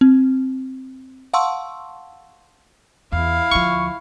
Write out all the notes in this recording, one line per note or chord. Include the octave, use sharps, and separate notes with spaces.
C4
F5 F#5 A5 C6 C#6 E6
E2 E4 F5
D2 F3 C#6